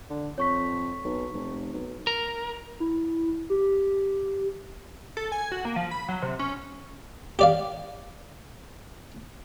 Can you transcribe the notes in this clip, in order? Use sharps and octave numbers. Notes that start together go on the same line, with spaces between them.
D3
F2 C#5 C#6 B6
B1
F1
B1
A#4
E4
G4
A4
G#5
F#4
A#3
F3
B5
F#3
C3
C#4
G4 D5 F5